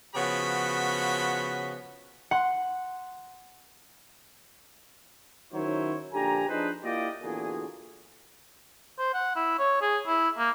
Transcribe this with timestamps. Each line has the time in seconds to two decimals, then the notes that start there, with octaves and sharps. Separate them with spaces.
0.16 C#3 F3 B3 F#4 B5
2.31 F#5 C6
5.53 D#3 F#3 C#4 E4 C5 C#5
6.13 A#1 D3 G4 G#5 A#5
6.49 F3 D4 D#4 G#4 B4 C5
6.84 A#3 E4 F4 G4 D5 D#5
7.22 E2 A#2 D3 F#4 G#4
8.99 C5
9.14 F#5
9.36 E4
9.59 C#5
9.82 G#4
10.07 E4
10.38 A#3